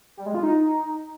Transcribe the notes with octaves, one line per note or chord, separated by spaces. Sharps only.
G3
G#3
F4
D#4